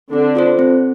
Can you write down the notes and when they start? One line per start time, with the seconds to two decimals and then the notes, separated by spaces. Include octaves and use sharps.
0.12 D3 C4 D4
0.35 F4 A4 C5
0.59 C4